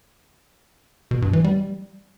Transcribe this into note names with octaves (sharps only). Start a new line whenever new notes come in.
B2
G2
E3
G3